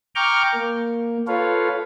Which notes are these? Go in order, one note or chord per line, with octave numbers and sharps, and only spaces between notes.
G5 A#5 C#6 D6 F6 G6
A#3
F4 A4 B4 C#5 F5